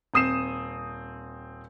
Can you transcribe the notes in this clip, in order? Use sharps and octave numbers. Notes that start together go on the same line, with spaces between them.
D#1 C4 D#6 C7 E7